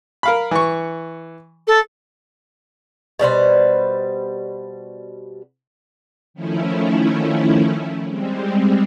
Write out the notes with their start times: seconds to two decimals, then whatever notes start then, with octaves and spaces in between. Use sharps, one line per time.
0.23 A#4 F5 B5
0.51 E3 C#6
1.67 A4
3.19 B2 G3 B4 C5
6.34 D#3 F3 A3 C#4 E4
8.08 G3 G#3 C4